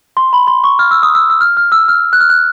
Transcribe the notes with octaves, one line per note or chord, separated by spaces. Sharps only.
C6
B5
C6
C#6
F6
E6
D#6
E6
E6
F6
F6
E6
F6
F#6
F6
F#6